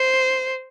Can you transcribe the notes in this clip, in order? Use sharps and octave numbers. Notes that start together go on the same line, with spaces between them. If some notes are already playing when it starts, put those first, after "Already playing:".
Already playing: C5